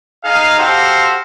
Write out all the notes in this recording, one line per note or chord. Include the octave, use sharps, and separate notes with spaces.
D#4 G#4 F5
F#4 G4 A4 C5 F5